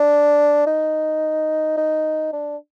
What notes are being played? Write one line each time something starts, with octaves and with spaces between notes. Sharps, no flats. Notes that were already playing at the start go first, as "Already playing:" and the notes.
Already playing: D4
D#4
D#4
D4